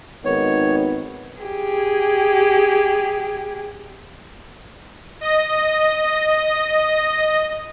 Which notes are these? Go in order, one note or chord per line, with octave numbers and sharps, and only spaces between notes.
G#1 D#3 B3 C#5
G4 G#4
D#5 A#6